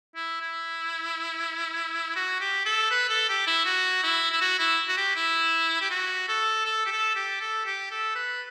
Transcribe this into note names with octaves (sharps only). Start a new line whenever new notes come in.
E4
E4
F#4
G4
A4
B4
A4
G4
E4
F#4
E4
E4
F#4
E4
F#4
G4
E4
G4
F#4
A4
A4
G4
A4
G4
A4
G4
A4
B4